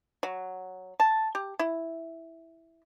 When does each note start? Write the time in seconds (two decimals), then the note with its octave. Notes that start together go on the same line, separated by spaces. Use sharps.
0.23 F#3
1.00 A5
1.35 G4
1.59 E4